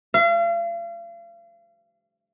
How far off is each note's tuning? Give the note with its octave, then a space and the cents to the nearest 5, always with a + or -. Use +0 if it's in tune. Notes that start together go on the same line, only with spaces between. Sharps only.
F5 -40